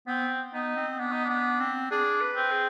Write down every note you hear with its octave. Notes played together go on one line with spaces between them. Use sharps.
B3 C4
B3 D#4
C4
B3 D4
D#4
B3 D4
C4
D4 G#4
B4
C4
G#4